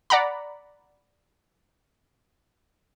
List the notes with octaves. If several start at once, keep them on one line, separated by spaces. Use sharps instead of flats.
D5 F#5 A#5 B5